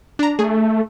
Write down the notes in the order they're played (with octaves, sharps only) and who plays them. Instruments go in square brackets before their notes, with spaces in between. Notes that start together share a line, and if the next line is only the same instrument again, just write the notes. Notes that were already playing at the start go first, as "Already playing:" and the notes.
[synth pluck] D4 A#5
[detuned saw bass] A3 [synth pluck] G#4